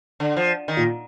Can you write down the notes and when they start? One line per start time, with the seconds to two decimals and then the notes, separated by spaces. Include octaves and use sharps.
0.20 D3
0.37 F3
0.68 D#3
0.77 A#2